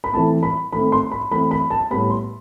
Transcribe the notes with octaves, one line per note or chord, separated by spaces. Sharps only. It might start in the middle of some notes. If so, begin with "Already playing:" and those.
B5
E3 A3 C4 A5
B5
D#3 A3 C4 B5
C6
B5
E3 A3 C4 B5
B5
A5
A2 G3 B3 B5
C6